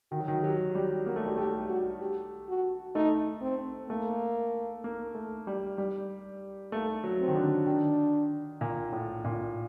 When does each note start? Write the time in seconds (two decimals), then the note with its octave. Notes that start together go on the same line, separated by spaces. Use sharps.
0.12 D#3 F#4
0.20 F#3
0.28 D#3
0.43 F#3 G4
0.75 G3 G4
1.06 A#3 F#4
1.16 A3
1.27 G3
1.37 A3 G4
1.69 F#4
2.01 G4
2.48 F#4
2.95 A3 D#4
3.42 C4
3.89 A3 A#3
4.84 A#3
5.15 A3
5.47 G3
5.78 G3
6.72 A3 A#3
7.04 F#3
7.20 C4
7.28 D#3
7.35 D3
7.66 D#3 D4
8.61 A#2
8.92 A2
9.24 A#2